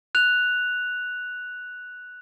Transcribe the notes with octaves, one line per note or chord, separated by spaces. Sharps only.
F#6 F7